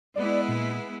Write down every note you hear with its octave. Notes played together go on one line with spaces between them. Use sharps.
G#3 B3 E4 D5
A#2